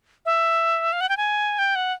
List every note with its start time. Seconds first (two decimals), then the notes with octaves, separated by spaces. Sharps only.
0.26 E5
0.93 F5
1.01 F#5
1.09 G5
1.17 G#5
1.59 G5
1.75 F#5